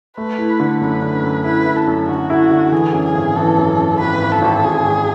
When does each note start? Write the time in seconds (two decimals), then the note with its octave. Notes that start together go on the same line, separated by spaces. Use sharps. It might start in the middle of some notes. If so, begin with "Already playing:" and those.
0.17 A3 B4
0.38 E4
0.60 D3
0.81 F#2 B4
1.02 D3
1.23 F#2
1.45 E4 B4
1.66 E4
1.77 A4
1.87 F#2
2.08 D3 F#4
2.30 E4
2.51 D3
2.72 E3 G#4
2.94 F#2
3.04 G#4
3.15 G#1
3.36 E3 A4
3.58 F#2
3.78 F#2
4.00 G#1 B4
4.21 G#1
4.32 A4
4.42 G#1
4.64 G#1 G#4
4.84 G#1